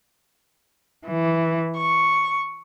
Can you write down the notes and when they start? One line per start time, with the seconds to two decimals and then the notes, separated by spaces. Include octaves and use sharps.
1.06 E3
1.77 C#6